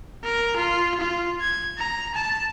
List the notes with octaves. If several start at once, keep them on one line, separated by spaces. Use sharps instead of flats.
A#4
F4
F4
G#6
A#5
A5